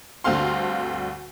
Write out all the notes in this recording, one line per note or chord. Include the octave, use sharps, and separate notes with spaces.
D2 G2 D3 C4 F5 C6